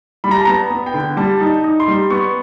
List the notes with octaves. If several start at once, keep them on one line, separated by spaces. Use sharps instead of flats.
G3 B5
A#5
A5
B3 A#5
B3
G5
D3
G3 A5
D#4
D#4
C6
G3
B3 C#6